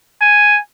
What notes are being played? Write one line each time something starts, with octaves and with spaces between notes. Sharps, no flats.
G#5